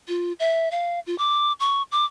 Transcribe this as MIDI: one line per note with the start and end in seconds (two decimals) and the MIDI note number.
0.08 0.33 65
0.40 0.69 76
0.71 1.00 77
1.07 1.17 65
1.18 1.53 86
1.60 1.83 85
1.92 2.05 86